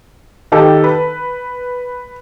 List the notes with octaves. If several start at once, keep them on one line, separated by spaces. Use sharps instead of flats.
D#3 G4 A4
B4